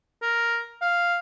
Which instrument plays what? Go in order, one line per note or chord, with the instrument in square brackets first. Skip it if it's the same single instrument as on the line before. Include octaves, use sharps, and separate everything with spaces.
[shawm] A#4
F5